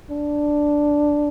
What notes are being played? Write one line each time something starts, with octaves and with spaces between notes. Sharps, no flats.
D4